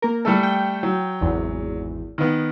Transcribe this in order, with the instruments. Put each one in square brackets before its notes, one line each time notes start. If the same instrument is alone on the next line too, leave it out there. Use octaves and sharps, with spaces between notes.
[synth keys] A#3 A#4
[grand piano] G3 A3 A4
[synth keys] G5
[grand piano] F#3
[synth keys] G#1 E2
[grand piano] D#3 B3